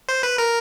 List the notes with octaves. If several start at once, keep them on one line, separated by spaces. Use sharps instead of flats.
C5
B4
A#4